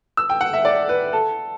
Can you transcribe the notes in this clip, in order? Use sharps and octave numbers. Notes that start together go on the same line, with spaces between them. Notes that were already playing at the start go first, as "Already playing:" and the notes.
E6
G5
F#5
E5
D5
B4
A4